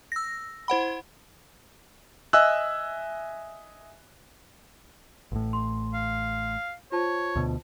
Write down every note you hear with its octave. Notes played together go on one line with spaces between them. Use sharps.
E6 A#6
E4 C5 F#5 B5
D#5 E5 G#5 E6 F#6
A1 A2
C6
F5
F4 C5 C#5 A5
D2 B2